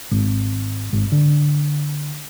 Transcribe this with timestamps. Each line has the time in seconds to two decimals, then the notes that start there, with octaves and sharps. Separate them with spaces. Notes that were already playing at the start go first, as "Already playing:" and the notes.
0.11 G#1
0.93 G#1
1.12 D3